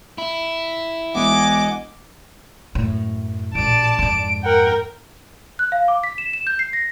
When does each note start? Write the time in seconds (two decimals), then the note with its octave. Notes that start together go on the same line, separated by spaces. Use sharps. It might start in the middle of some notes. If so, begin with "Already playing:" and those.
0.18 E4
1.15 E1 D#5 F#5 G#5 D6
2.75 F#2 A2
3.55 A1 A#2 D5 A5 D7
3.99 F2 G#2 D7
4.43 A#4 F#5 G5
5.59 F#6
5.72 F5
5.88 D6
6.04 B6
6.18 E7
6.33 E7
6.47 G6
6.59 C7
6.73 A#6